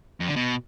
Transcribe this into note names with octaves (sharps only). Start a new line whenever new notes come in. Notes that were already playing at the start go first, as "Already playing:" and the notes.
F2
D3
B2